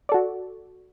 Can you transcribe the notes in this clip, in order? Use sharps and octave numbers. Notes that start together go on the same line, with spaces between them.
F#4 A4 D5